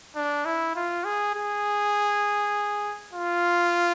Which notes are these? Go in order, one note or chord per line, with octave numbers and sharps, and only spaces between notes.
D4
E4
F4
G#4
G#4
F4